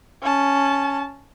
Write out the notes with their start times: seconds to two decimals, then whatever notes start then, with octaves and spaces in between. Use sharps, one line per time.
0.22 C#4 A5